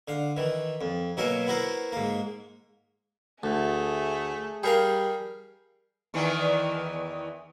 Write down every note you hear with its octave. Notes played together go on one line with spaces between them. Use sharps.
D3 F5
D#3 E3
F2
B2 F#3 A#3 A#4 E5 G#5
B3 E4 F#4 A#4 C5
G#2 A#3
D2 A3 G#4
G3 G#4 A#4 F5
E2 D#3 E3